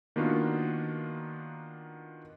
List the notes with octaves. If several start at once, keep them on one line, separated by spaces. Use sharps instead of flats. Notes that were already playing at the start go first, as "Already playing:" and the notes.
D#3 A#3 B3 D4 F4 F#4